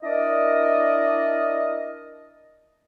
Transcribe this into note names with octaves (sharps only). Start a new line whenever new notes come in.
D4 E4 A#4 D5 D#5